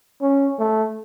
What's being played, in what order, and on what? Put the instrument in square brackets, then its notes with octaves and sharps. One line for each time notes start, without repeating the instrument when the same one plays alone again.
[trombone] C#4
A3